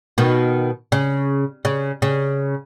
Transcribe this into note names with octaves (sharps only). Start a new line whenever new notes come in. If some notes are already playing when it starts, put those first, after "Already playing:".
B2 D#3
C#3
C#3
C#3